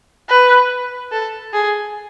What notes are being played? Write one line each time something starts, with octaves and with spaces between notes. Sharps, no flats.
B4
A4
G#4